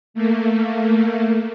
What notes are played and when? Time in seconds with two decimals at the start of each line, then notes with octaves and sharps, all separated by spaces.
0.14 A3 A#3